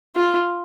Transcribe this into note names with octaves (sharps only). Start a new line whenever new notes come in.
F4